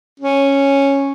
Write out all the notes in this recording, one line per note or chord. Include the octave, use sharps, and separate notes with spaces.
C#4